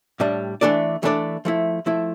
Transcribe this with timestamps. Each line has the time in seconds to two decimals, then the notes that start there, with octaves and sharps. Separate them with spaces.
0.20 A2 G3 D4 G4
0.61 E3 A3 D4 A4 D5
1.03 E3 A3 D4 A4 D5
1.45 F3 A3 E4
1.86 F3 A3 E4